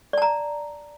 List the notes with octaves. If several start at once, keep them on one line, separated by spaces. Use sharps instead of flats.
D5 A5 A#5